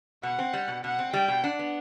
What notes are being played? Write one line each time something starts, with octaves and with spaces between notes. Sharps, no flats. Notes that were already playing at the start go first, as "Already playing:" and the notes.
B2 F#5
C4
G3
B2
B2 F#5
C4
G3 G5
B2
D4 F#5
B3